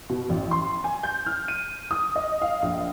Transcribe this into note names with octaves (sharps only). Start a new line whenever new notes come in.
B2
A1
C6
G#5
G6
F6
D#7
D#6
D#5
F5
A#1